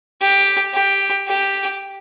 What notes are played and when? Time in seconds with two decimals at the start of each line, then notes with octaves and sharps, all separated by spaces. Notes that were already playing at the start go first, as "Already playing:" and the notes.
0.21 G4
0.74 G4
1.27 G4